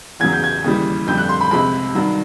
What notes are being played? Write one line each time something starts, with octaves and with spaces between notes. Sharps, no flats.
E2 C#3 F#3 G#6
G6
G#6
D#2 C#3 E3 G3
F2 D3 G3 G6
F#6
C6
B5
C#2 C3 F3 G#3 B5
G2 D#3 F#3